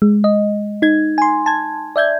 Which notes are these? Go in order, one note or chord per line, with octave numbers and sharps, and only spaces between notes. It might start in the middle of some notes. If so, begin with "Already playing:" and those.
G#3
D#5
D#4 G#6
G#5 C6
A5 G#6
D5 E5 G6 G#6